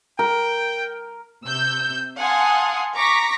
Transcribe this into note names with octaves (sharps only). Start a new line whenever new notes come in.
A#4 G5
C3 E6 G6
F5 F#5 G#5 A5 C6 D#6
A#5 C#6 D6 A#6 B6